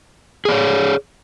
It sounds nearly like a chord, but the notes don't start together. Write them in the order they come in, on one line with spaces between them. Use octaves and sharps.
G#4 D5 C#5